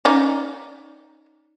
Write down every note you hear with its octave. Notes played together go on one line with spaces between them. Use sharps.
C#4 D#4 D5